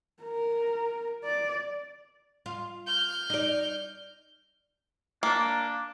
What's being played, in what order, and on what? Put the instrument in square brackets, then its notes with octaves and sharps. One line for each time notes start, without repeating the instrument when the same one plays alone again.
[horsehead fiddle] A#4
D5
[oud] F4
[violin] F6 G6
[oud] D#4 D5
[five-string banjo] A#3 [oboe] D4